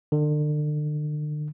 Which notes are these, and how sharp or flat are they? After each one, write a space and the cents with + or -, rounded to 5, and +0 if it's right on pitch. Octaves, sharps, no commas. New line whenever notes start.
D3 +40